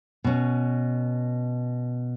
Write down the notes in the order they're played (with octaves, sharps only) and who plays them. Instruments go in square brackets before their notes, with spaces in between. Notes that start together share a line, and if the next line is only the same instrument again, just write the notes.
[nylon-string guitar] B2 C#4